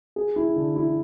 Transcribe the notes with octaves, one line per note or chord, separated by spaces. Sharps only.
G#4
E4
D3
E4